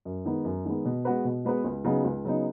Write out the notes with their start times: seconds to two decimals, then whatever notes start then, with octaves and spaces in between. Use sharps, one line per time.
0.05 F#2
0.25 D#3 G#3 B3
0.45 F#2
0.65 D#3 G#3 B3
0.85 B2
1.05 G#3 B3 F#4 B4
1.25 B2
1.45 G#3 B3 F#4 B4
1.65 C#2
1.85 C#3 F#3 B3 D#4
2.05 C#2
2.24 C#3 F#3 B3 D#4